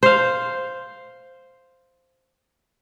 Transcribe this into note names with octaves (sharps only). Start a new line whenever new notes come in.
C5 F5